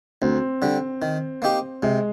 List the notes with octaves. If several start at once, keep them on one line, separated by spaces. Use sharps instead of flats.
D2 C4
D3 G3
D#3
A#3 D#4 G4
C3 G#3